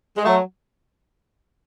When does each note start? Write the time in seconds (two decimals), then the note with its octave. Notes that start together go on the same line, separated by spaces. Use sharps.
0.17 G#3
0.25 F#3 A3